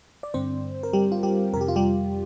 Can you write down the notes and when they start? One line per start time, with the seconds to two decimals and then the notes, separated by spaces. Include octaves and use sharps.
0.23 D5
0.34 G2 D3 C4 C5
0.83 A#4
0.93 G3 G4
1.12 F4
1.23 G3 G4
1.53 F2 A#4
1.56 C3 G4
1.68 F4
1.76 G3 G4